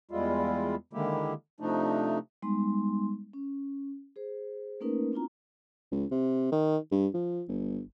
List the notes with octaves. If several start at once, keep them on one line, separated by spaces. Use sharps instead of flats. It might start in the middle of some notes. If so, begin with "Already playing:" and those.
E2 G3 G#3 E4 F4
D3 D#3 G#3 A#3 E4 G4
C3 F3 A3 D4 D#4
G3 G#3 B3 D#4 C6
C#4
G#4 C5
A3 A#3 C#4 D#4 A#4 B4
C4 D4 E4 F4 A#5
C#2
C3
D#3
G2
F3
G1